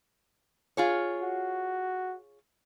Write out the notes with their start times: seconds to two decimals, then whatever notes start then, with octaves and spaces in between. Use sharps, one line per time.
0.77 F4 G#4 C#5
1.23 F#4